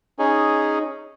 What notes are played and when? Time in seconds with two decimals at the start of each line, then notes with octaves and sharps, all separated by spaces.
0.19 C#4 D#4 G#4